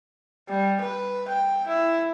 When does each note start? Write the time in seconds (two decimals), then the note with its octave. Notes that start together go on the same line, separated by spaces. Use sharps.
0.48 G3
0.81 B4
1.28 G5
1.67 E4